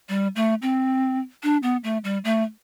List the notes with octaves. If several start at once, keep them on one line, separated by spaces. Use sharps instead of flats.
G3
A3
C4
D4
B3
A3
G3
A3